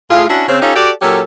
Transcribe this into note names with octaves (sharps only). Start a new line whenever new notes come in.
A2 F4 G#4
C#4 D4 E4 F#4
C#3 C4
C#4 D#4 F4 G4 A4 C#5
F#4 G4 A4 D5
A#2 F#3 C#4 G4 A4